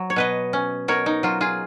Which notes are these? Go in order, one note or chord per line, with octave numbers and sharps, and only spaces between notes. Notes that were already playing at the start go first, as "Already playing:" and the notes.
Already playing: F#3
C#5
B2 B4 D#5
C#4
B2 A#4 C#5
D#4
F#3 F4
F4 G#4